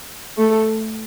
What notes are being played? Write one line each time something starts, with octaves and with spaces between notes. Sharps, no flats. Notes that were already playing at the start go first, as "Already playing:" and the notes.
A3 A4